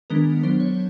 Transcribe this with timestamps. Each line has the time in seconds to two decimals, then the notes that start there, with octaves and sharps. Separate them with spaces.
0.10 D#3 G#3 B3 D4 A#4
0.43 F#3 B3 D4 C5
0.60 C#5